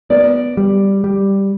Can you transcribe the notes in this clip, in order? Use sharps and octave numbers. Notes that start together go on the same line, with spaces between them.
B3 D5
G3
G3